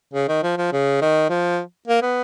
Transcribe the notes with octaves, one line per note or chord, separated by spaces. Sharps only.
C#3
D#3
F3
F3
C#3
D#3
F3
A#3
B3